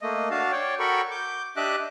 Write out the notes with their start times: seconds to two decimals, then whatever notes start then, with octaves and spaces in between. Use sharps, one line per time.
0.02 A3 A#3 D#5
0.31 D4 F#4 F5 A5
0.52 C#5 D5 G5
0.80 F#4 A4 A#4 G5 B5 C#6
1.11 D6 G6
1.57 D4 G4 D#5 E5 D6 F#6